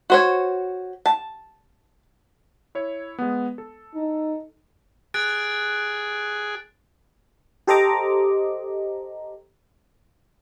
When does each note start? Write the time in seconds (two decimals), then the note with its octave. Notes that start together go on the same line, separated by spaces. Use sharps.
0.10 F#4 C5 C#5
1.06 A5
2.75 E4 C#5
3.18 G#3 B3
3.58 A4
3.95 D#4
5.14 G#4 F#6 A6 D7
7.67 G4 A4 C5 D#5 A#5 D6